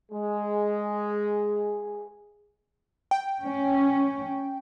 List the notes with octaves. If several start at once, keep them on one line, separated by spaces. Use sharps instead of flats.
G#3 G#4
G5
C#4